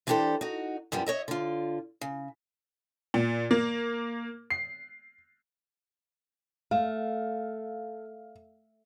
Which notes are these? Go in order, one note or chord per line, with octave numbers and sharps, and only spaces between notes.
E3 D4 E4 G4 A4 C5
D#4 F#4
F#2 F3 G3 B3
C#5 D#5 E5
D3 F4
C#3
A#2
A#3
C7
A3 F5